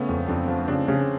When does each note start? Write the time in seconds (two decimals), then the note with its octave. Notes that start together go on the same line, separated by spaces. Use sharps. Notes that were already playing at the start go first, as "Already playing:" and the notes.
Already playing: C#3 A3 B3 C#4
0.09 F2
0.28 F2 C4 D4
0.48 F3
0.68 C#3 C4 D4
0.88 C#3